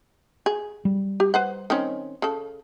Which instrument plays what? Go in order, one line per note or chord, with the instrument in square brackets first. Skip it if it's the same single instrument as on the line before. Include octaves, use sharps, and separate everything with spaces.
[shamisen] G#4
[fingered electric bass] G3
[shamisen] G4
B4 C5 F#5
D#3 C4 C#4
C#3 A4